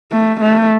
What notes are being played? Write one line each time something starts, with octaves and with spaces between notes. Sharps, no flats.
A3
A3